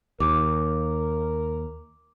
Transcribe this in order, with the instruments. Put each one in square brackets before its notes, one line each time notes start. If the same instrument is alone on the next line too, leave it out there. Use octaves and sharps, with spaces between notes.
[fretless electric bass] D#2 [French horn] A#4 [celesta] D6